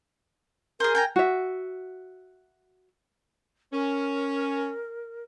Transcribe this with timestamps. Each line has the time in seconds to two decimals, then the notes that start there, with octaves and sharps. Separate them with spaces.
0.80 G#4 A#4 C5
0.95 G5 G#5 A#5
1.16 F#4 E5
3.73 C#4 A#4